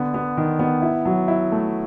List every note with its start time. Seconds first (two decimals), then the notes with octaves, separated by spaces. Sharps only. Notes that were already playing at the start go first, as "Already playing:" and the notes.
Already playing: D3 B3
0.14 B3
0.37 D#3
0.59 B3
0.82 E4
1.05 F#3
1.28 E4
1.52 A3